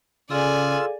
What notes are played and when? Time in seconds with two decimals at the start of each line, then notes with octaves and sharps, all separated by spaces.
0.30 C#3 F4 G#4 A4 D5 F5 G#5 E6